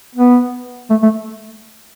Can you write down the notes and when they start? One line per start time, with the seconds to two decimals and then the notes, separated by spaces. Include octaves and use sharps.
0.15 B3
0.90 A3
1.03 A3